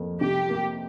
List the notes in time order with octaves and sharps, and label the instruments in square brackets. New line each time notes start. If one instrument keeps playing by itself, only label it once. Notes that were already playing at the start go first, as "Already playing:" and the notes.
Already playing: [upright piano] F2 A#3
[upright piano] C3 [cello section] G4
[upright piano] A#3